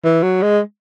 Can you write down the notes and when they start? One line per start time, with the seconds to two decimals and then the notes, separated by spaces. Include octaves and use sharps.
0.04 E3
0.23 F#3
0.42 G#3